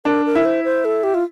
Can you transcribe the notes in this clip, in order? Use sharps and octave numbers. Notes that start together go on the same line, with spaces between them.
D4 A#4
A#4
E4
C5
C5
A4
G4
F4